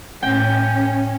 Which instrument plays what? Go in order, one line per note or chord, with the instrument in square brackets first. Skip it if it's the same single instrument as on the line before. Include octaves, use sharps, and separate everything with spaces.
[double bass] A2 [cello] C#4 [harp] G5